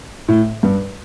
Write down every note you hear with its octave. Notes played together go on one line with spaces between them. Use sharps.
A2
G2